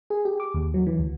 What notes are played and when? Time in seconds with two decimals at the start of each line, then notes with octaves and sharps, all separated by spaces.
0.10 G#4
0.25 G4
0.40 D6
0.54 D#2
0.74 F#3
0.87 E3
0.99 D2